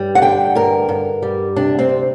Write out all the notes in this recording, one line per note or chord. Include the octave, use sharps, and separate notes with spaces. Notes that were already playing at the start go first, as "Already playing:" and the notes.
Already playing: G2 G3
F#5
D3 G5
G2 A#4
G2
G3
C3 D4
C4
D2